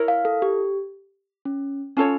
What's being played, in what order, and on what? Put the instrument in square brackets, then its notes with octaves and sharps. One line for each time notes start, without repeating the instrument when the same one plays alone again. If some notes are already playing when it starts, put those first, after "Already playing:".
Already playing: [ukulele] E4 A#4 C#5
[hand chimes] F5
A4
G4
C#4
[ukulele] C#4 F4 A4 C#5